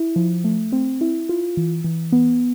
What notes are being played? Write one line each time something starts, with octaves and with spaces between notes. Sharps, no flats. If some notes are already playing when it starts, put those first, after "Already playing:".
Already playing: E4
F3
A3
C4
E4
F4
E3
E3
B3